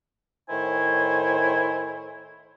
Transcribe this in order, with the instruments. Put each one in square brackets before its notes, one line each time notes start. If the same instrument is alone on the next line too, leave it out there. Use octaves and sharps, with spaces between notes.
[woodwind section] A2 D#3 E4 C5 C#5 G#5